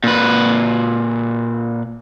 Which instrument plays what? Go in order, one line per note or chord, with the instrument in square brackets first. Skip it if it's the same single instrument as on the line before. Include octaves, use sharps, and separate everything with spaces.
[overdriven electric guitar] A#2 B4